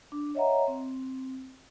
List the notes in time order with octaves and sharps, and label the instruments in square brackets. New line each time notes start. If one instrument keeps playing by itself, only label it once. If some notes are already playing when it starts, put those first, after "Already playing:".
[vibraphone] D4
C#5 D#5 E5 F#5 A#5
C4